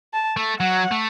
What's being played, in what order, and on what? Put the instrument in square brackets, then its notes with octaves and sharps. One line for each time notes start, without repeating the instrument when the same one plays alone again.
[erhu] A5
[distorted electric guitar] A3
[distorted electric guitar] F#3 [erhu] F#5
[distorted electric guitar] A3